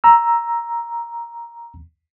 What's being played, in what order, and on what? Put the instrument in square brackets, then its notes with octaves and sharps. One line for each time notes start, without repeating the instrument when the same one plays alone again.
[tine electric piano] A#5 E6